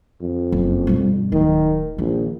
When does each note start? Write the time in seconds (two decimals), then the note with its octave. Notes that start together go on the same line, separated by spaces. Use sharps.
0.22 F2
0.52 F#1
0.87 G2 B2
1.32 D1 D#3
1.98 A#1 D#3